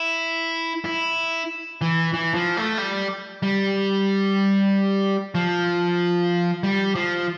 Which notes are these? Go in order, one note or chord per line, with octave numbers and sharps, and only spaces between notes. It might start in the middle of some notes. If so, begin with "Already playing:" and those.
Already playing: E4
E4
E3
E3
F3
A3
G3
G3
F3
G3
F3